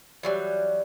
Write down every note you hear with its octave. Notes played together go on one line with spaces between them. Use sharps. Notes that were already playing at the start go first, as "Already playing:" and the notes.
E3 F#3 G3